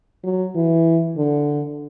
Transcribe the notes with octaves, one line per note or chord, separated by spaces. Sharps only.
F#3
E3
D3